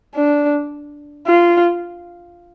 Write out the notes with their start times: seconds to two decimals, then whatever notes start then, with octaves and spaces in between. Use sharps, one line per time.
0.15 D4
1.26 F4